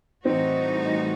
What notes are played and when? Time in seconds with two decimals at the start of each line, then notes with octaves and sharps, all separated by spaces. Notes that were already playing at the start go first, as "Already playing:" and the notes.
0.25 A2 E3 G3 C4 D#4 F#4